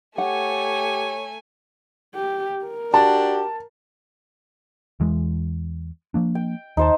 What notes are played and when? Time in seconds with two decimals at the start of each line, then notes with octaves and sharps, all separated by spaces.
0.18 A3 G4 C#5 F#5 G#5
2.14 G4
2.65 A#4
2.94 D4 F#4 G4 A5
5.00 E2 E3 G#3
6.14 F3 A#3 D4
6.35 G5
6.77 D#2 D#4 C5 A5